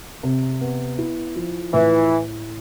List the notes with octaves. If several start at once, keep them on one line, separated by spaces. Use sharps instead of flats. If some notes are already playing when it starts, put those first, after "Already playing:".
C3
B3
E4
F3
A2 E3